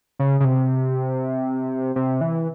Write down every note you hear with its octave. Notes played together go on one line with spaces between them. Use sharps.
C#3
C#3
C3
C3
E3